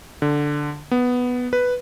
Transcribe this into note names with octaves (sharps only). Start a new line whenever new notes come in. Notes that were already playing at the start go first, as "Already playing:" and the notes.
D3
B3
B4